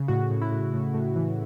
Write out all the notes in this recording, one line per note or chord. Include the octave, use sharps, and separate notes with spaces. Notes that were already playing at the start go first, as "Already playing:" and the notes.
Already playing: C#3
A2 F#4
A2
E4
A2
A2
A2
E3